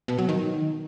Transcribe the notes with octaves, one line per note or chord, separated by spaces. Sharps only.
B2
F#3
D#3